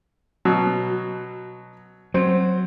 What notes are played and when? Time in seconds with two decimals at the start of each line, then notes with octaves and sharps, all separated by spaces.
0.45 B2 F#3
2.14 F#3 C4